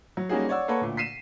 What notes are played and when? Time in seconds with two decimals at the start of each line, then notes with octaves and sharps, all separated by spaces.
0.17 F#3
0.29 G3 A#3 C#4 D#4 F#4 G#4
0.49 C#5 D5 F#5 E6
0.68 A#3 A4 B4 C#5 F#5
0.81 D2 A#2
0.97 B6 C7 D#7 E7